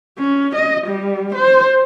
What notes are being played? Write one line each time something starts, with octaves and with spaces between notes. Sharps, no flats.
C#4
D#5
G3
C5